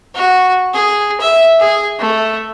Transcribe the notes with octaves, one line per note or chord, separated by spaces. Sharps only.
F#4
G#4
E5
G#4
A3